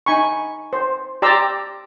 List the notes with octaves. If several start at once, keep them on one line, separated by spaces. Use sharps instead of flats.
D#4 G#5 B5 C#6
C5
G4 D5 A#5 C6 E6